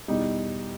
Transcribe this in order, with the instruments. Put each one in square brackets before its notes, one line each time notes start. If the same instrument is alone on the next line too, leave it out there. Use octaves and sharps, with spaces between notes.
[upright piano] E2 B2 G3 D#4